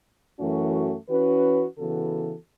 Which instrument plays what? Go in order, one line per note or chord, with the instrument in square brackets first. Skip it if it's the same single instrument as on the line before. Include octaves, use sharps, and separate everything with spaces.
[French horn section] F#2 E3 A3 C#4 F#4
E3 C#4 F#4 B4
C#3 E3 B3 F#4 A4